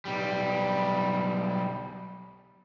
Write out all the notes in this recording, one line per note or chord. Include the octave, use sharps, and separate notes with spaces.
B1 G3